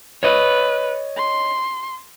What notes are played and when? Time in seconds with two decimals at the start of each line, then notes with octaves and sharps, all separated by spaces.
0.23 B4 C#5 D#5
1.17 C6